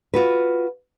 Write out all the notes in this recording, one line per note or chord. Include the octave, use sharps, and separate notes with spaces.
F4 F#4 B4